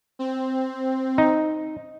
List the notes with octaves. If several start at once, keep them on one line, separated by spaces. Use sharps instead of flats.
C4
D#4